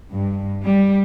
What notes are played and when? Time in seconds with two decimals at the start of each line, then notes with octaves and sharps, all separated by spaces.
0.13 G2
0.65 G3